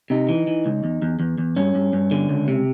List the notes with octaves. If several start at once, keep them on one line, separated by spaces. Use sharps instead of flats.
C3 D#4
E3
E3
C#2
E2
E2
E2
E2
G2 C#4
G2
G2
D3
C#2
C3